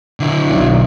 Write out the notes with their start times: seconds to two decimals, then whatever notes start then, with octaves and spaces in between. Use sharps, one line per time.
0.20 D3 E4
0.50 B1